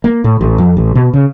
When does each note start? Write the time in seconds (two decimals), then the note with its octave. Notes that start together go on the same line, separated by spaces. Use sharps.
0.04 A#3
0.24 A2
0.41 A1
0.58 F2
0.77 A1
0.95 B2
1.13 C#3